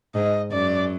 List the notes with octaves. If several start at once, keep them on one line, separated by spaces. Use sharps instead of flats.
G#2 D#5
F#2 D5